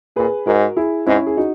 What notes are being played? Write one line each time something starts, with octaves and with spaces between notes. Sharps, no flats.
A#2 G#4 B4
G#2 F#4 A#4
E4 G#4
G#2 C#4 E4
G#4
D#4 F#4